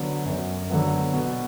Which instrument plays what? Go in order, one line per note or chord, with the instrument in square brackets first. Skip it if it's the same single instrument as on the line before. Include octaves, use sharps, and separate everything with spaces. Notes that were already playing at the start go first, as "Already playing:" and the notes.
Already playing: [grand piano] D3 F#3 B3
F#2
D3 F#3 B3
B2